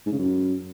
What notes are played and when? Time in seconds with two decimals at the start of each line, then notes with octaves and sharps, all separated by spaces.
0.06 G#2
0.12 C#3
0.19 F#2